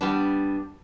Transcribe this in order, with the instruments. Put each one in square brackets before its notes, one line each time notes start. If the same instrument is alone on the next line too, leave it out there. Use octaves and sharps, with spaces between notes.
[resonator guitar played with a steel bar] G3 B3 D4